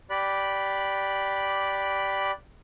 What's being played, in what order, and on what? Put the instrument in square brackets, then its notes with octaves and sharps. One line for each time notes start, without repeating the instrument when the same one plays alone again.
[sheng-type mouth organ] G4 D5 B5 F#6